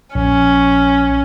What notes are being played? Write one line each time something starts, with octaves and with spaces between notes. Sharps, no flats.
A#1 C#4